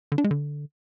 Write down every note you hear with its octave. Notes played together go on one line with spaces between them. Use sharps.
D3
D4
G#3
D3